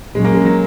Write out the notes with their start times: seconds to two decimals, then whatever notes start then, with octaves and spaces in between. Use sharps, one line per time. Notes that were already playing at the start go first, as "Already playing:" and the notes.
0.14 A#2 F#3 G#3 C#4
0.25 A#3
0.35 G#3
0.45 F#3